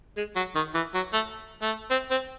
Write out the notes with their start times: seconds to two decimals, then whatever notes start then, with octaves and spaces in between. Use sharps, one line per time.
0.17 G#3
0.36 F#3
0.55 D#3
0.74 E3
0.94 F#3
1.13 A3
1.62 A3
1.90 C4
2.10 C4